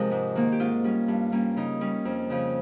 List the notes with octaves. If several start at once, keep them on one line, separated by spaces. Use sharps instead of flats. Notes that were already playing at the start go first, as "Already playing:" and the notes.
Already playing: C3 F3 G#3 A#4
G#2
D#3 A#3
G4
G#2 F4
G3 C#4
G2
G3 A#3 C#4
C#3 D#4
G3 C#4
F2
C#3 F3